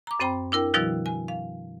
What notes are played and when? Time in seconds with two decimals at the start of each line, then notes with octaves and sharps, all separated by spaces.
0.07 A#5 D6
0.20 F#2 C4 C5 G5 B5
0.52 D4 E4 A#4 G5
0.74 B2 D#3 F3 G3 E4 F#4
1.06 G#5
1.28 F5